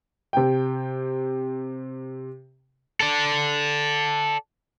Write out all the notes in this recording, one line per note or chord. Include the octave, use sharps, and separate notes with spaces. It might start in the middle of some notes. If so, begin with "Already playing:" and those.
C3 G5
A4 D5